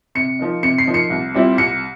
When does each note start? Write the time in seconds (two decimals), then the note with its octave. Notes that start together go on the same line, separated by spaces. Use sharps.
0.15 C3 C#7
0.39 F3 A#3 D#4
0.63 C3 C#7
0.78 C7
0.86 F3 A#3 D#4
0.94 C#7
1.10 C2
1.34 A#2 G3 C4 E4
1.58 C2 C#7